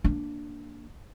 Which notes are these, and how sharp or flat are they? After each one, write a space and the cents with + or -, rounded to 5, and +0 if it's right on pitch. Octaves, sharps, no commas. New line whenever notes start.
A#3 +0 D4 +0